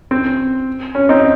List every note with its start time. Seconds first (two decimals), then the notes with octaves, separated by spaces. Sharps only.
0.11 C4
0.95 C#4
1.09 C4 D#4